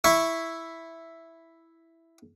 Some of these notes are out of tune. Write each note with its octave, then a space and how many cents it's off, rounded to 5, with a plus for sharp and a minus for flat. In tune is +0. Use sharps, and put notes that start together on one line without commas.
E4 +0 C#6 +0